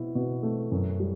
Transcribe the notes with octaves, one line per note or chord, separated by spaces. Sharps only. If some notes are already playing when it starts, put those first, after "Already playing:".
Already playing: B2 E4
B2
A3
F#2
G3